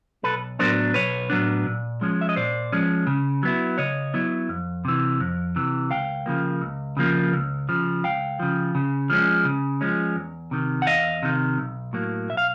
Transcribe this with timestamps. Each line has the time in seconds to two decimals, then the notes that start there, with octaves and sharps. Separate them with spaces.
0.23 B1 A4 B4
0.59 A2 F#3 B3 D4 A#4 C5
0.94 B1 B4 C#5
1.30 A2 F#3 B3 D4
1.66 A#2
2.01 F3 G#3 C#4
2.21 E5
2.29 D#5
2.36 A#2 C5 D5
2.72 F3 G#3 C#4
3.07 C#3
3.43 F#3 B3 E4
3.78 C#3 C#5 D#5
4.14 F#3 B3 E4
4.49 F2
4.85 C3 E3
5.20 F2
5.56 C3 E3
5.90 C#2 F5 G5
6.26 C#3 F3 A#3
6.62 C#2
6.97 C#3 F3 A#3
7.33 C#2
7.69 C#3 F3
8.04 C#2 F5 G5
8.40 C#3 F3
8.75 C#3
9.10 F3 G#3 C#4
9.45 C#3
9.81 F3 G#3 C#4
10.16 E2
10.51 C3 D#3
10.82 F#5
10.87 E2 D#5 F5
11.23 C3 D#3
11.58 B1
11.93 A2 F#3 A#3
12.29 B1 E5
12.37 F5